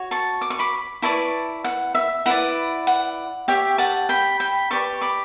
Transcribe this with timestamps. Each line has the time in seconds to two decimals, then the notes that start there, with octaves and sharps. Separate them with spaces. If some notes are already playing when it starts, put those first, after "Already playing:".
Already playing: F#4 C#5
0.11 A5 C#6
0.41 D6
0.50 C#6
0.59 B5 D6
1.02 E4 B4 D5 A5 C#6
1.64 F#5
1.95 E5
2.26 E4 B4 D5 F#5
2.87 F#5
3.48 G4 C#5 E5 G5
3.78 F#5 A5
4.09 G5 B5
4.40 G5 B5
4.70 G4 B4 D5 A5 C#6
5.01 B5 D6